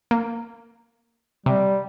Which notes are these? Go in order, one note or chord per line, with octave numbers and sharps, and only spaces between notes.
A#3
C3 G3